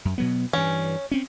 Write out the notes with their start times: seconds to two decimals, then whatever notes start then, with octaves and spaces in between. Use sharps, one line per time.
0.05 F#2
0.18 B2 F#3 B3
0.53 G2 E3 C#4
1.11 C4 C#4